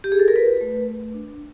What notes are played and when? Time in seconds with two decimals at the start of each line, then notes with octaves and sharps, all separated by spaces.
0.04 G4
0.12 G#4
0.19 A4
0.28 A#4
0.35 F4 B4
0.61 A3
0.88 A3
1.13 D4